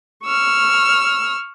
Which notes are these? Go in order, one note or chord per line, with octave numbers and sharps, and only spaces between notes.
C#6 E6 F6